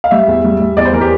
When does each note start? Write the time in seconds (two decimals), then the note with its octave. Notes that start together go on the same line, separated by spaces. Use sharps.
0.04 F5
0.11 G3 E5
0.28 E2
0.44 G3
0.60 G3
0.77 E2 D5
0.85 C5
0.93 E3 A#4
1.01 G4